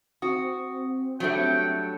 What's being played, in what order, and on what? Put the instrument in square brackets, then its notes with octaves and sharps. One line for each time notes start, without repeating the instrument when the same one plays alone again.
[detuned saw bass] C4 [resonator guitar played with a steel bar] F#4 [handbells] D#6
[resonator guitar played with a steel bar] F#3 G3 A3 [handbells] D4 [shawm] G5